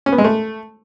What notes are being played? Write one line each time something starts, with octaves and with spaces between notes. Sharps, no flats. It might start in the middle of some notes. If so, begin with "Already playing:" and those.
C#4
B3
G#3
A3